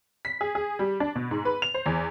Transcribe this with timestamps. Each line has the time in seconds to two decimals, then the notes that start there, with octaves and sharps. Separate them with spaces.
0.25 B6
0.41 G#4
0.55 G#4
0.79 G3
1.00 D4
1.15 B2
1.31 G#2
1.45 B4
1.62 F7
1.74 C5
1.86 E2